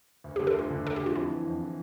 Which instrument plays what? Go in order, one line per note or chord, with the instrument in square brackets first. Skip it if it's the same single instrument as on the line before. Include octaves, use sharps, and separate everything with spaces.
[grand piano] D2
[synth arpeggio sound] G4
[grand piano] D3
[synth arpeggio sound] A4
[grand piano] D2 [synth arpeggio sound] F4
[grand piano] D3
[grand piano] D2 [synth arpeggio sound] A4
[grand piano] D3 [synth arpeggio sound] G4
[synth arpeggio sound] F4
[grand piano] F2 [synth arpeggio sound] E4
[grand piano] E3
F2
E3